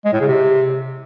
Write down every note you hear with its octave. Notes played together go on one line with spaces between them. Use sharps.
G#3
A2
C#3
C3